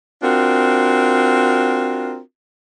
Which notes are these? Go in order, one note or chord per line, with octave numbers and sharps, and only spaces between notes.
C4 D4 F4 F#4 A#4